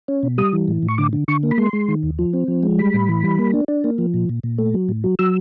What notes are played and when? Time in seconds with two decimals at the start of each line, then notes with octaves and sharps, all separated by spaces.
0.08 C#4
0.23 B2
0.38 G3 D#6
0.53 E3
0.68 A2
0.83 A2
0.89 C#6
0.98 D3 D6
1.13 D3
1.28 D3 C#6
1.43 A#3
1.51 B5
1.58 G#3 C6
1.73 G#3
1.88 D#3
2.03 D#2
2.19 F3
2.33 C4
2.48 F3
2.63 G#3
2.78 G3 B5
2.94 A2
3.08 E3
3.23 G3
3.39 A#3
3.53 D4
3.68 D4
3.84 A#3
3.98 F3
4.14 A#2
4.29 A#2
4.43 A#2
4.59 A3
4.74 F#3
4.89 A2
5.04 F#3
5.19 F#3 E6